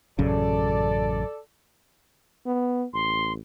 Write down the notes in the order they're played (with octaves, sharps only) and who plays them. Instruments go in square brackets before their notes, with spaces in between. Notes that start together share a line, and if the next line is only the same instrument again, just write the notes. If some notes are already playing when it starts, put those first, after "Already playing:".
[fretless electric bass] A1 F#2 C#3 [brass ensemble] A4 D5
[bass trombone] B3
[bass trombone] A1 [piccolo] C6